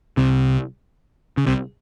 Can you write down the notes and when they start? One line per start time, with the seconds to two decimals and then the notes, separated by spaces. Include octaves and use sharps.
0.17 C2 C3
1.37 C#3
1.47 C2 C3